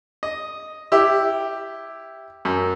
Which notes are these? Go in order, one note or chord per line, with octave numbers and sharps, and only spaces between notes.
D#5
E4 G4 E6
F#2